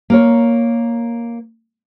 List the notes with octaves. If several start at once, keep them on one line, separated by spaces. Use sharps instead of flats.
A#3 A#4 C#5